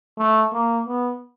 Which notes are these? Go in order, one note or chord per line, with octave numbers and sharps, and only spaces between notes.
A3
A#3
B3